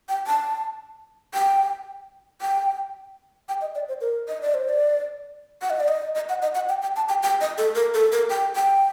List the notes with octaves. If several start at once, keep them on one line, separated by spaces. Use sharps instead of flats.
G5
A5
G5
G5
G5
D#5
D5
C5
A#4
D#5
D5
C5
D5
F#5
D#5
D5
D#5
D#5
F#5
D#5
F#5
G5
G5
A5
G5
G5
D#5
A4
A#4
A4
A#4
G5
G5